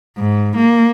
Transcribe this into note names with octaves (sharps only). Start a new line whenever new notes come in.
G#2
A#3